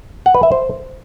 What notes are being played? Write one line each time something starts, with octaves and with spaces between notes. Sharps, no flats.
F#5
B4
E5
C5